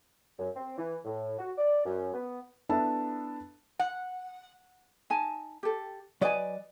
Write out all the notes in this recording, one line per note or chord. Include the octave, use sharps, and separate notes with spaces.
F#2
C4
E3
A2
F#4
D5
F#2
B3
B3 D4 E4 A4 E5 A5
F#5
D#4 G#5 A5
G4 A4
F#3 B4 D5 D#5 G#5